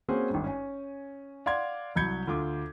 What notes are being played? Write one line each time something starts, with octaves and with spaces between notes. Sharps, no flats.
A#3 C4 C#4 F#4 G#4 C5
G#1 G2
C#4 G#5
D5 F5 F#5 C6 G#6
C2 F#3 B5 G6 G#6 C#7
D2 F4 D6